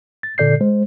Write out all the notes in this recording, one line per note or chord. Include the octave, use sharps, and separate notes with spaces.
A6
A#2 D3 A4 D5 G6 C7
G#3 C5